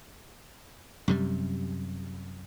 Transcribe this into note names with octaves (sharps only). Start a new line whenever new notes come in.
F#2 C3 G3